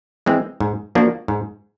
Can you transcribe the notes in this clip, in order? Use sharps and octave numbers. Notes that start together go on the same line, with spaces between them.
E3 G#3 C4
G#2
F3 A#3 D4 F#4
G#2